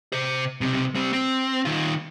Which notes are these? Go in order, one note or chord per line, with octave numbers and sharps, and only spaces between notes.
C3 C5
B1 C3
G3 C4
C4
D#3 F4